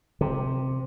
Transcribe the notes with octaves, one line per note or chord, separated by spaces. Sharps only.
C3